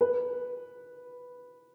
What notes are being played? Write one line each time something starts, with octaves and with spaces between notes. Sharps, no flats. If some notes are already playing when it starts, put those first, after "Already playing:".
B4